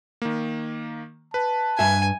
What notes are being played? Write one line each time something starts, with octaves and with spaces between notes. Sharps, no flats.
D#3 A#3
B4 A5
G2 E5 G#5